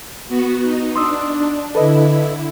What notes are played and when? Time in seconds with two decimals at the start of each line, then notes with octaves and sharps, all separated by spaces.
0.28 B3 F#4
0.62 D#4
0.96 D4 C6 D#6 E6
1.75 D3 E4 A4 B4 D#5